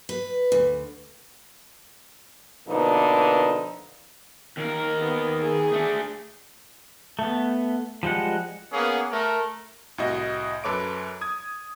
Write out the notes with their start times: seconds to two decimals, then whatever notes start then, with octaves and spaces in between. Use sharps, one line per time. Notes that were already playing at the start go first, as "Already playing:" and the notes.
0.09 B4
0.52 D2
2.68 B2 D3 F3 A#3 D#4 B4
4.57 D#2 A#4
5.00 B3
5.42 G#4
5.73 A3 D4
7.19 A3 B3
8.03 F3 G3 G#3 F#5
8.72 A#3 B3 C#4 G#4
9.10 A3 A#4
9.98 C2 A2 F#4 D#5
10.64 F#2 A4 B4 C#5 D6 D7
11.21 D#6 G#6